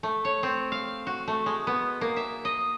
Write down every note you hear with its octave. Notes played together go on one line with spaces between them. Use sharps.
A3
C#5
C4
F5
F#4
A3
G#3
B3
A#3
E5
D#5